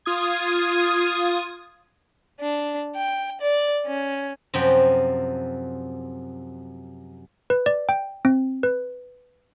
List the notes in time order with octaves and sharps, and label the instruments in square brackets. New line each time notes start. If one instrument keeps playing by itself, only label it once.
[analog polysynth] F4 D#6 G#6
[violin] D4
G5
D5
C#4
[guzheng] F#2 C3 F3 G5
[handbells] B4
D5
G5
C4
B4